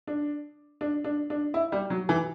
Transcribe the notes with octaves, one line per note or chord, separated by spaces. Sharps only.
D4
D4
D4
D4
E4
G3
F#3
E3